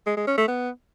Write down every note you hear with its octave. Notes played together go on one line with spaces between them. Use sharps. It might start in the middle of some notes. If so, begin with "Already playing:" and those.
G#3
G#3
C#4
A3
B3